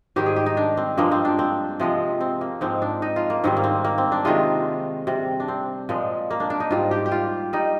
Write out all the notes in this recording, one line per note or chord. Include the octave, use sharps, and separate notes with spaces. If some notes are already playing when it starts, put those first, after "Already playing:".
G#2 D#3 G3 G4
G#4
G4
D#4
D4
C4
G2 F3 G#3 A#3
C4
D4
C4
C3 F3 G#3
C4
A#3
G#2 F3 G#3 C4
D4
D#4
F4
A#3
G#2 D#3 G3 C4
A#3
C4
A#3
C4
D4
C3 D#3 G#3 F4
C3 G3
D4
C4
A#2 F3 G#3
A#3
D4
D4
D#4
G#2 G3 F4
G4
G4
F4
G3 D#4